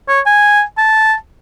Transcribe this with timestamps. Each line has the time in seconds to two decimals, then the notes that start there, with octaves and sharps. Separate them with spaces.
0.08 C#5
0.26 G#5
0.78 A5